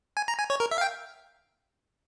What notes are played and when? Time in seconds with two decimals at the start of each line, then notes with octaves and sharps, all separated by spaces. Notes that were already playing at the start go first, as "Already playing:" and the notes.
0.17 G#5
0.28 A#5
0.39 G#5
0.50 C#5
0.60 A#4
0.71 E5
0.78 F5
0.81 G5